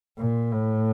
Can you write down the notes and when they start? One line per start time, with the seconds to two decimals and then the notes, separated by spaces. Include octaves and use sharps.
0.19 A#2
0.52 A2